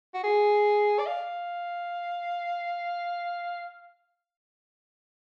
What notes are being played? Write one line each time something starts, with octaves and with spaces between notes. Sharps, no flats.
F#4
G#4
D5
F5